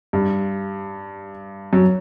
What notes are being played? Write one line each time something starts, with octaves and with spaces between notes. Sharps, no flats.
G2
F#2